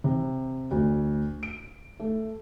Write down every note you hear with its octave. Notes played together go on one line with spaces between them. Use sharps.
C3
D2
D7
A3